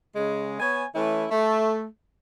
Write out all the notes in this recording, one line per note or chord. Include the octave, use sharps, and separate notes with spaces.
C#3 G#3
B3 C#5 G#5
E3 A3 C#4 E4
A3